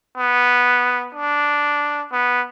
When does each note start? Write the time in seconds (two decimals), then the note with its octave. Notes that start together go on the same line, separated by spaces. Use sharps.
0.18 B3
1.15 D4
2.12 B3